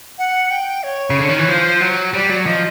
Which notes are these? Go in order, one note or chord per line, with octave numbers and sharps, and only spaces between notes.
F#5
G5
C#5
C#3
D3
D#3
E3
F3 C5
F#3
G3 D5
F#3
F3 D#5